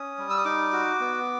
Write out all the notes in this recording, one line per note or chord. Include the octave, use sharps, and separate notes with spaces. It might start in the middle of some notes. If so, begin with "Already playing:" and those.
Already playing: C#4 D#6
G3
E6
D#6
D#4 D6
F#4
B3